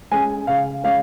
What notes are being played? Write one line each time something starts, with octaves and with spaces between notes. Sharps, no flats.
G#3 C#4 G#5
C#3 F5
G#3 C#4 F5